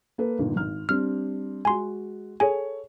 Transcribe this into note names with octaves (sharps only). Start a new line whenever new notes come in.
A#3 A4 B4
G1 D#2 A#2
G#1 F6
G3 C4 D4 F6
G#3 F#4 G#5 C6
G#4 A4 C#5 G#5